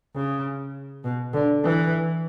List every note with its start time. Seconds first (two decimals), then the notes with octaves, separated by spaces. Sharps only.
0.15 C#3
1.04 B2
1.34 D3
1.64 E3